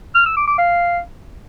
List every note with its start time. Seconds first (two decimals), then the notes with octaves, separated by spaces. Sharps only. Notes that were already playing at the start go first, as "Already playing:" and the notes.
0.15 F6
0.26 E6
0.37 D6
0.47 D6
0.58 F5